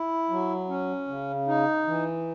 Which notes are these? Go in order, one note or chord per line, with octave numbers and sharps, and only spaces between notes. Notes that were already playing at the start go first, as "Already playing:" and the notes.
Already playing: E4
F#3
C#4
C#3
D#4
E3